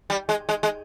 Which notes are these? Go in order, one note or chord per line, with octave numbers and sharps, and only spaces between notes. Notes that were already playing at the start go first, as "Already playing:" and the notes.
G3
G#3
G#3
G#3